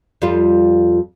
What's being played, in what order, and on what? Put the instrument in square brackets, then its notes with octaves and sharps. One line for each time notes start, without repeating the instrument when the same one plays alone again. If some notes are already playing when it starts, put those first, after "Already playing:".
[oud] F2 G3 F4